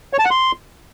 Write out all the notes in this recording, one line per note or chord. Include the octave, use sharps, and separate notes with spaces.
C#5
A5
F#5
C6